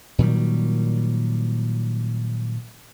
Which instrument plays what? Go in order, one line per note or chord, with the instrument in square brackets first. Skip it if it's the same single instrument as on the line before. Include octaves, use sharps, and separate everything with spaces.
[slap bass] A#2 D#3 F#3 G3